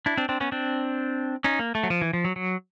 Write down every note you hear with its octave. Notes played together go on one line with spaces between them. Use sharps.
D4 E4
C4 D4
C4 D4
B3 C#4
C4 D4
C#4 D#4
A#3
A3
F#3
F3
E3
F3
F#3
F#3